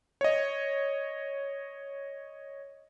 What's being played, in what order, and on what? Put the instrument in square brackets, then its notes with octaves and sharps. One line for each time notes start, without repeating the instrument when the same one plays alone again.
[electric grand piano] C#5 D#5